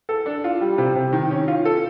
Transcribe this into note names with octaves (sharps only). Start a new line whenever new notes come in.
A4
D4
F4
G3
C3
C3
D#3
C#4
F4
A4